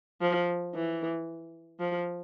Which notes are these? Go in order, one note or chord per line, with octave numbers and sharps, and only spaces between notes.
F3
E3
F3